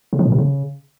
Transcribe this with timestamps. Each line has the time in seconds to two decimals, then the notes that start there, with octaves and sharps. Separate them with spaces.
0.13 C#3
0.19 F3
0.26 A#2
0.32 C3
0.38 C#3